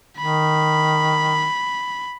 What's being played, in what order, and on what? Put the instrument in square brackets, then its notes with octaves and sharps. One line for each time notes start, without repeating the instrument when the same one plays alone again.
[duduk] D#3 [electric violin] B5